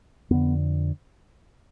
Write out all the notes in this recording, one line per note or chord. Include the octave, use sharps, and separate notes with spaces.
F2 D3 B3